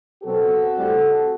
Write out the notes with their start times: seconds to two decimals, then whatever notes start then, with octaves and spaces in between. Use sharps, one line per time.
0.23 B2 F#3 C4 F#4 A4
0.76 A2 G3 C4